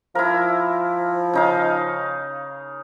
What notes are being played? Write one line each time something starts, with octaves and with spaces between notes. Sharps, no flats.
F3 E4 A#4
C#3 D#4 F5